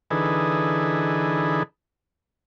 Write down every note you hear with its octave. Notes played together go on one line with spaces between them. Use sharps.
D3 E3 D#4 G#4 A4 B4